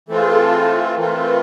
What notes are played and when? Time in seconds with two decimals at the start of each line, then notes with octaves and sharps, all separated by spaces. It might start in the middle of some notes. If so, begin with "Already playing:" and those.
0.08 E3 A3 C4 F4 A4
0.21 G#4
0.32 A4
0.96 E3 A3 C4 F4 A#4
1.25 B4